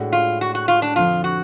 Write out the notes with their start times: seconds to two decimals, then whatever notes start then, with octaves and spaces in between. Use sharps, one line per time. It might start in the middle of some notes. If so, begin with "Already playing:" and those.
Already playing: A2 G#3 D4 F#4
0.12 F4
0.41 F#4
0.55 F#4
0.68 F4
0.82 D4
0.96 F2 D3 F3 F4
1.24 F#4